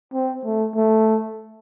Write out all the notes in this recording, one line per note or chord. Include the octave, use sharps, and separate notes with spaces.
C4
A3
A3